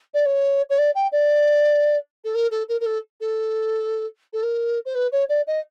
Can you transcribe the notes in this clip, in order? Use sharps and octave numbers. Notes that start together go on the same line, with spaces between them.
D5
C#5
C#5
D5
G5
D5
A4
A#4
A4
A#4
A#4
A4
A4
A4
A#4
C5
B4
C#5
D5
D#5